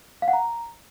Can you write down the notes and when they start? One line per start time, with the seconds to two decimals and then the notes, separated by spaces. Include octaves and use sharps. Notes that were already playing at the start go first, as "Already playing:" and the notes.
0.22 F5
0.28 F#5
0.33 A#5